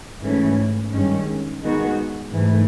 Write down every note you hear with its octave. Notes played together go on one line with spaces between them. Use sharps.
G#2 E3 A3 C#4
G2 D#3 G#3 C#4
D#3 G#3 B3 D#4 F#4
G#2 E3 A3